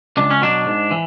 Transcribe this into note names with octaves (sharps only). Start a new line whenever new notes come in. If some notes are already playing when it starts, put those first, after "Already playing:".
C#2 D4
C#4
B2 F#3 D4
G#2
E3